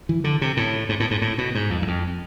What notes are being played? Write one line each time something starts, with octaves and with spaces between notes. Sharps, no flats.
E3
D3
C3
A2
G#2
A2
G#2
A2
B2
G#2
F2
E2
F2